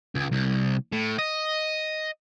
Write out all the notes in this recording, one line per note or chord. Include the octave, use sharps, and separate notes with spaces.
C#2
C2
A2
D#5